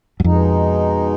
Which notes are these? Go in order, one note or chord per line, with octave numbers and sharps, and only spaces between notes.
F#2
F2 B2 G#3 D#4